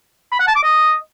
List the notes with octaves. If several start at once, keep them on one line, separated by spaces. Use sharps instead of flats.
B5
F#5
A5
D6
D#5